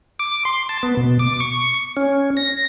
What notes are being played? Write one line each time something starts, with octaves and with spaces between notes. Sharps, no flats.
D6
C6
A5
B3
B2
D6
C#6
C#4
A#6